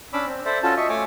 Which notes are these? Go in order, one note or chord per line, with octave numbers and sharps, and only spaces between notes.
C#4 D4 B5 D6 E6
C4
A4 C5 D5 E5
C#4 F4 F#4 A4 A5
D#5 E5 C#6
A3 C#5 G#5 D6